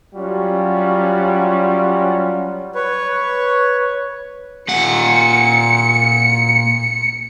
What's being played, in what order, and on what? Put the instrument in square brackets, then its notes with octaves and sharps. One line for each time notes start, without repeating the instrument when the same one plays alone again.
[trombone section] F#3 G3 C#4 F4 F#4
[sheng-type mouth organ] B4 C#5
[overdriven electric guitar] A#2 F#5 [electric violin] C#7